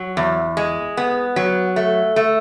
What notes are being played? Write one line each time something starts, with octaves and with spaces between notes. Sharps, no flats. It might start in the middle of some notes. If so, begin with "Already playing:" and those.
Already playing: F#3
E2
G#3
B3
F#3
A3
A3